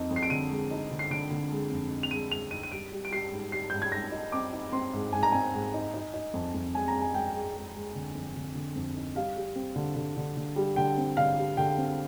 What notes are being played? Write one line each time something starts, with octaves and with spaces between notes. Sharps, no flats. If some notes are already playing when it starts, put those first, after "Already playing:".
Already playing: F2 D#4
F2
C7
D7
D3 D#7
G#3
D#4
D3
C7
D3 D7
D3
G#3
F2
D#4
F7
G#3 D#7
G#3 F7
D#4 D#7
D#7
G3 D7
G3
D7
G3 C7
G#2
G3 C7
G#2 G6
G#6
G#2 A#6
D#4
C4 D6
D#4
C4 C6
G#2
G#2 G#5
A#5
C4 G#5
G#2
D#4
D#4
D#4
F2
F2
G#3 G#5
A#5
G#3
G#5
G#3 G5
G#3
G#3
G#3
D3
F2
D3
D3
F2
D#4
G3 F5
G3
C4
D3
D3
D3
D3
G3
D3 G5
C4
D3 F5
G3
D3 G5
C4